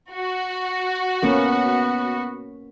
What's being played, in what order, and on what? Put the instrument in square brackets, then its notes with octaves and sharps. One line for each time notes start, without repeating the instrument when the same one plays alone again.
[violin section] F#4
[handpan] A#3 C#4 A#4 [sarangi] B3